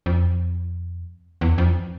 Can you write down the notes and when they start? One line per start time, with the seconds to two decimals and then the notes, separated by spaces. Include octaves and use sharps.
0.06 F2
1.41 E2
1.58 F2